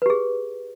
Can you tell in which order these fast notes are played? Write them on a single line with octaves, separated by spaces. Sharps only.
B4 G4 G#4